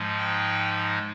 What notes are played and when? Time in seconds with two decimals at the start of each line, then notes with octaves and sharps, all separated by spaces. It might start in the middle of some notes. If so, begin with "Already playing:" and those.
Already playing: G#2 F3 G#3 D#4
0.18 G5